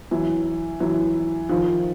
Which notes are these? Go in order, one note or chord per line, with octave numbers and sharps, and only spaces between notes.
E3 F#3
E3 F#3
D#3 F3